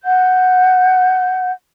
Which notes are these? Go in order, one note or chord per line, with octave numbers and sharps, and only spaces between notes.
F#5 G6